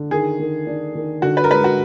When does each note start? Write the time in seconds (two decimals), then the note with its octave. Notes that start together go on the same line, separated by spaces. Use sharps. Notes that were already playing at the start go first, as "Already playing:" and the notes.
Already playing: D3
0.11 D#3 G#4
0.39 D#3
0.67 D4
0.95 D#3
1.22 D3 F#4
1.37 B4
1.44 A#4
1.51 G#3 B4
1.64 F#4